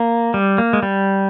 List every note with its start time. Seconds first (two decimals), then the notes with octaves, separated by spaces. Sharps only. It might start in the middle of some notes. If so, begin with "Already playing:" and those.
Already playing: A#3
0.34 G3
0.58 A#3
0.73 G#3
0.83 G3